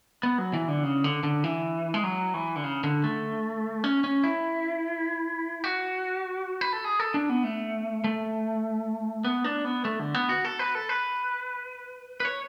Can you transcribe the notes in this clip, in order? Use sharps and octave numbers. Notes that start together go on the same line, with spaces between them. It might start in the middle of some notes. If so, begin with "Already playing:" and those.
B3
F#3
E3
D3
C#3
D3
D3
E3
G#3
F#3
E3
D3
C#3
D3
A3
C#4
C#4
E4
F#4
B4
A4
G#4
A4
D4
B3
A3
A3
B3
D4
B3
A3
D3
B3
F#4
A4
B4
A4
B4
B4
C#5